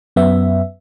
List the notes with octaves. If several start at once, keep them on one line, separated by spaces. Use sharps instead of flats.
F#2 B3 E5